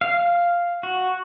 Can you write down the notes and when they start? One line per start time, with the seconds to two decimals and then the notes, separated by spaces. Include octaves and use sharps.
0.01 F5
0.83 F#4